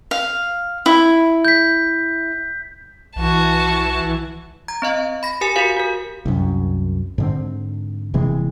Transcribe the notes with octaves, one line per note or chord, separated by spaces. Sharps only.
F5
E4
G6 B6
B1 E3 F#4 A5
A#5 G#6
C4 D#5 F5
B5 A#6
G4 A#4 G#5
F#4 G4 A#4 F5
F#4 A#4
C2 F#2
G#2 D3 C4
D#1 C3 E3 G#3